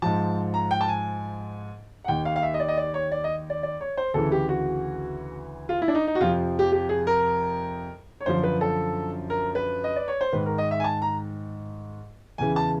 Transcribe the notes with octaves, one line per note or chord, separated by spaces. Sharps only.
G#2 F3 A5
A#5
G5
A5
G#5
F#5
D#2 D#3 G5
F5
F5
E5
D#5
D5
D#5
D5
C#5
D5
D#5
D5
D5
C#5
C5
D2 C#3 E3 A4
G4
F#4
F4
E4
D4
D#4
D#4
F#4
F2 C3 F3 F4
G4
G4
G#4
A#4
C#5
F#2 D3 F3 C5
B4
A4
A#4
B4
D#5
D5
C#5
C5
G#2 D#3 B4
A#4
D#5
E5
G#5
A5
A#5
E2 C#3 E3 G#5
A5